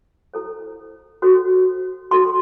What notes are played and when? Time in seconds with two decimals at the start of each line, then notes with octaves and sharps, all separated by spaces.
0.34 E4 A4 C5
1.22 F#4 A4 C5
2.11 F#4 A4 C5 C6